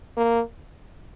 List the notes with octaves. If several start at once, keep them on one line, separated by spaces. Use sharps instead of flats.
A#3